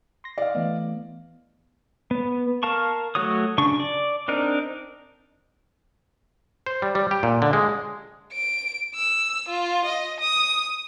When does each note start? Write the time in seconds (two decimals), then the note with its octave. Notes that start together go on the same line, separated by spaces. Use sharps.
0.24 C6 A#6
0.38 D5 D#5 F5
0.55 E3 A3 B3
2.11 B3
2.63 A#4 F5 A5 C#6
3.15 F#3 A3 F#4 C#5 D#6
3.58 C#3 D4 C#6
3.80 D5
4.28 C4 D4 D#4 A#4
6.66 C5
6.82 G3
6.95 G3
7.11 G4
7.23 A#2
7.42 D3
7.53 G#3
8.33 D7
8.95 E6
9.49 F4
9.86 D#5
10.20 D#6